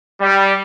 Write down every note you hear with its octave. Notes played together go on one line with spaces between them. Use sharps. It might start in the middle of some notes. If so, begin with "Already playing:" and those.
G3